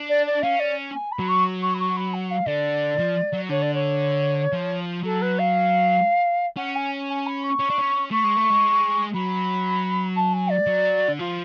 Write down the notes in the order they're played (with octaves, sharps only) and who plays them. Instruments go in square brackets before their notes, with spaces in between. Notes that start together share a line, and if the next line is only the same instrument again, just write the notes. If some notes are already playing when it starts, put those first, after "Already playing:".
Already playing: [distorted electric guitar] D4
[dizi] D5
D5
[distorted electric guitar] C#4 [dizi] F5
[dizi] D5
G#5
B5
[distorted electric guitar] F#3
[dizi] C#6
C#6
B5
C#6
B5
F#5
F5
[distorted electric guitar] D3 [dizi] D5
[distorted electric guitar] F3
F#3
[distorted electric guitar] D3 [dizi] C#5
[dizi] D5
C#5
[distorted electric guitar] F3
[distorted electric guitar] F#3 [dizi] A4
[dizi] B4
F5
[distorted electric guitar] C#4 [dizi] F#5
[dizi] G#5
G#5
B5
C#6
[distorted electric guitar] C#4
D4
C#4
[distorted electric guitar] A3 [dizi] C#6
[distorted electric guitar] G#3
A3
G#3
[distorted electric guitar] F#3 [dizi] B5
[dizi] A5
G#5
D5
[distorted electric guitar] F#3
D3
[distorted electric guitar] F3 [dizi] F4